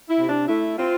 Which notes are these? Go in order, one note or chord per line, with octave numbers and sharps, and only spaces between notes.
E4
C3
D4
A3 E4
C4 F4